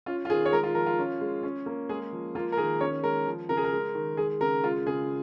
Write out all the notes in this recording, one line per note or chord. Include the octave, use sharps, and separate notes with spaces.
C#4 F4
F4
D#3 G#4
C#5
G#3 A#4
F4
F3 A#4
F4
C#4
G#3
C#4
A#3
G#3 G#4
F3
A#3 F4
A#4
D#3 G#4
C#4 C#5
G#3 A#4
F3
C#3 A#4
G#4
A#4
G#3
D#3
G#3 G#4
C#3 A#4
G#3 F4
C#3 G#4